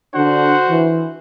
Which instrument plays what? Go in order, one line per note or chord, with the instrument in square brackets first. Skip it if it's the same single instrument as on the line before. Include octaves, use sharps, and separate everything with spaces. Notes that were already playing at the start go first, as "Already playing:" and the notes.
[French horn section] D3 D4 [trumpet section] F#4 C5 F#5
[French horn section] E3